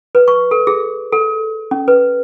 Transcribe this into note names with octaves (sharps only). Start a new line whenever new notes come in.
B4
C#6
A4
G#4
A4
C#4
B4